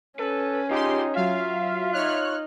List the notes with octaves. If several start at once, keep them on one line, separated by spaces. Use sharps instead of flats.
C#4 A4 B4
D#4 F4 G4 G#4 C6
F#3 F4 E5 F5
D#4 C#5 F6 F#6